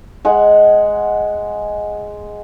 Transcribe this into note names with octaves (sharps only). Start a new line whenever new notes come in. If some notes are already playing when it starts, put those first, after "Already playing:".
G#3 F#5